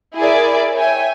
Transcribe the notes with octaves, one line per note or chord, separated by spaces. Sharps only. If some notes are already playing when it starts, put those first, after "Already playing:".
E4 G#4 A#4 D5 E5
C#5 E5 G5 G#5